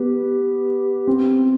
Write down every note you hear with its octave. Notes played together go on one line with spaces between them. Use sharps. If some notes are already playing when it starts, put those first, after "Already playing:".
Already playing: B3 G4
C4